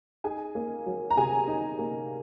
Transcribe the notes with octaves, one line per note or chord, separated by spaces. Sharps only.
D#4 G#4 G#5
A#3
F#3
A#5
C3 G#4 G#5
D#4
A#3